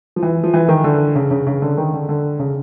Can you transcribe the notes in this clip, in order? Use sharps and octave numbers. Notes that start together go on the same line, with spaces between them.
F3
E3
F3
E3
D#3
D3
C#3
C#3
C#3
D3
D#3
D3
D3
C#3